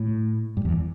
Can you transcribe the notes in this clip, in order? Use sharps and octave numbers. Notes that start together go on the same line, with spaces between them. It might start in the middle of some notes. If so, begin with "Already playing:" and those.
Already playing: A2
G2
E2